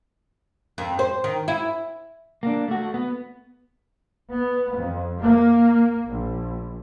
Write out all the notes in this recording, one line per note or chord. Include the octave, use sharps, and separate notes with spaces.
F2
C5
D#3
E4
A#3 D4
A3 F#4
B3
B3
F2
A#3
A#1